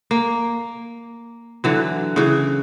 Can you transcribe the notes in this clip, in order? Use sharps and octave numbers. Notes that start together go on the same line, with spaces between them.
A#3
D3 E3 F#3
C#3 E3